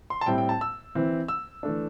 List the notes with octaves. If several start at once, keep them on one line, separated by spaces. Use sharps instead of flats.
C6
A5
A2 G3 C4 E4 G5
G5
A5
E6
E3 C4 E4
E6
E3 A3 D4